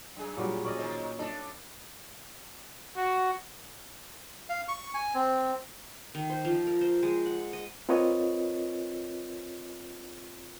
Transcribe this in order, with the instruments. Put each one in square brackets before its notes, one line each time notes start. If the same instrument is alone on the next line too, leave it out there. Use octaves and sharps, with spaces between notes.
[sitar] F#2 G#4
[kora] A#2 F#3 G3
C#4 D5 D#5
[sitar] D#3 G#3 C4
[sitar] D4 [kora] A4 D#5 E5
[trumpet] F#4
[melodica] F5
C#6
G#5
C4
[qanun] D#3
C5
F3
A#4
C5
G#3
F#5
D#5
[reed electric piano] C4 F4 A#4 B4 C#5 D#5